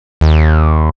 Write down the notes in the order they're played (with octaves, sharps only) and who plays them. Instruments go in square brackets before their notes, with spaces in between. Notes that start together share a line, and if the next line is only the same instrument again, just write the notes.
[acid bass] D#2